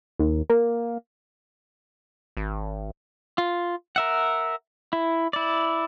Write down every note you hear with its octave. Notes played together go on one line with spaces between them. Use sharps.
D#2
A#3
G#1
F4
A#4 E5 F#5
E4
E4 D5